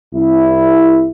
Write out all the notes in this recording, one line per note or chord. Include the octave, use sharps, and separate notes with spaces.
C2 E4